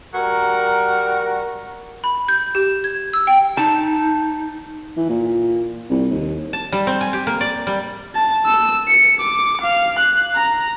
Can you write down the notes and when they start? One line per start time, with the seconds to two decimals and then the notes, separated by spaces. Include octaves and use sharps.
0.13 G3 F#4 A#4
2.04 B5
2.28 G6
2.55 G4
2.84 G#6
3.13 E6
3.27 G5
3.57 D#4 A5
4.97 E3
5.09 A#2
5.90 C2
6.11 D#2
6.53 A5
6.72 G3
6.87 C4
7.01 G#5
7.13 G4
7.27 A#3
7.41 D5
7.67 G3
8.15 A5
8.46 E6
8.88 C#7
9.21 D6
9.61 F5
9.99 F#6
10.35 A#5